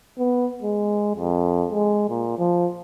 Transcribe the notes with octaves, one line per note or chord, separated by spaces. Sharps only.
B3
G#3
F2
G#3
A#2
F3